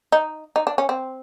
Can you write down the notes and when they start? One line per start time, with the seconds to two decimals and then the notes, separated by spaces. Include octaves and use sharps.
0.12 D#4
0.56 D#4
0.67 D4
0.78 C#4
0.89 C4